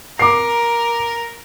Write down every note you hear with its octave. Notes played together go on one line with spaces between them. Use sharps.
A#4 D6 C7